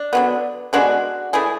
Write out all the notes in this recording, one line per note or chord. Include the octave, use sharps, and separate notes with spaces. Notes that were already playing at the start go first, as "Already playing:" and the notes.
Already playing: D4
D3 F#3 B3
D3 G#3 B3 D4 F#4
E3 A3 E4 G#4